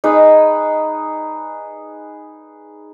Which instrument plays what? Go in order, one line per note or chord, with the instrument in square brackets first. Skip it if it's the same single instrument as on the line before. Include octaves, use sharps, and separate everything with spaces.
[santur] D#4 G#4 B4